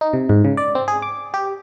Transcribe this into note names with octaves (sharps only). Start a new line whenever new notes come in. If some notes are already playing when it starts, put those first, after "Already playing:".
D#4
C3
G#2
C#3
D5
C4
G#4
D6
G4